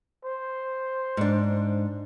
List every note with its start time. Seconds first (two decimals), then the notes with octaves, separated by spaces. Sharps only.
0.25 C5
1.17 G#2 D4